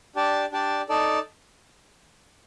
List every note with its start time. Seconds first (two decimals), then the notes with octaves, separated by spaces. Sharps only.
0.16 D4 G4 D5 A5
0.52 D4 G4 D5 A5
0.89 D#4 A4 D5 A5